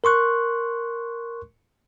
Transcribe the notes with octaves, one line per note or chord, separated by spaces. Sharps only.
A#4 C6 C#6 F#6